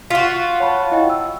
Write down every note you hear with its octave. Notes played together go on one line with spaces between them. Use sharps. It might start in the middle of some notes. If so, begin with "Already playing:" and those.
F4 F#4 B6
C#5 A5 B5
E4 D#5 G5
E6